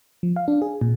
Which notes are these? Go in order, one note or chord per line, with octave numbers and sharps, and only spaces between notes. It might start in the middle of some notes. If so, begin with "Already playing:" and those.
F3
F5
D4
G#4
A#2